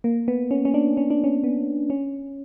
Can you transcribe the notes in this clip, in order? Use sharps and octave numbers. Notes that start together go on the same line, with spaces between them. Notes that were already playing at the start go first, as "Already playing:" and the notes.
A#3
B3
C#4
C#4
D4
C#4
D4
C#4
B3
C#4